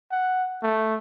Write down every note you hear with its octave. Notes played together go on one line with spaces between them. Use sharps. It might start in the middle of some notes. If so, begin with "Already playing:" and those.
F#5
A3